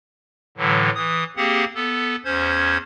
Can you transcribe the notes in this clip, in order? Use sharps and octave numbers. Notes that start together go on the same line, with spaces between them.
A2 D3 E3 F#3
E3 D#6
A#3 C4 G4 G#4 F#5
B3 A4
E2 C#4 C5 G#6